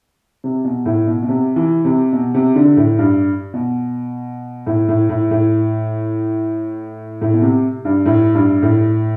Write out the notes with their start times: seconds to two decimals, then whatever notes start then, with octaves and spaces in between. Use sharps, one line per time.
0.44 C3
0.64 B2
0.86 A2
1.07 B2
1.23 B2
1.29 C3
1.56 E3
1.85 C3
2.13 B2
2.34 C3
2.56 D3
2.77 A2
2.98 G2
3.54 B2
4.67 A2
4.89 A2
5.09 A2
5.31 A2
7.22 A2
7.33 B2
7.42 C3
7.85 G2
8.06 A2
8.34 G2
8.63 A2